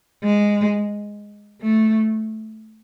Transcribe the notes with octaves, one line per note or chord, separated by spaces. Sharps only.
G#3
A3